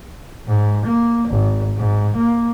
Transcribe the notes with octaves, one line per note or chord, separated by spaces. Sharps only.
G#2
A#3
G#1
G#2
A#3